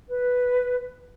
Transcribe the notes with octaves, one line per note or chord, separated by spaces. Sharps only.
B4